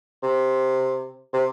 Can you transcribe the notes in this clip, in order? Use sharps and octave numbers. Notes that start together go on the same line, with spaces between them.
C3
C3